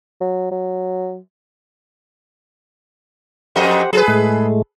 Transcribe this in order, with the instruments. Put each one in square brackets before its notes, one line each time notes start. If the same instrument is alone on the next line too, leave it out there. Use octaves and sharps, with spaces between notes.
[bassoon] F#3
F#3
[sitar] F2 A4 D#5 [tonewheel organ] G4 C5 F#5
[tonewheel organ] F#3 [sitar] G#4 A4 B4
[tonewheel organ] A2 G#3 A3